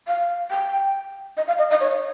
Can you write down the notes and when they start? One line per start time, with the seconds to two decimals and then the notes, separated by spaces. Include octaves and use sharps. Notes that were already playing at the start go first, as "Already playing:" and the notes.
0.08 F5
0.51 G5
1.37 D#5
1.47 F5
1.59 D#5
1.70 D#5
1.81 C#5